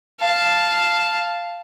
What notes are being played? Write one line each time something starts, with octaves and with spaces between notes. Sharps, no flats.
F5 A5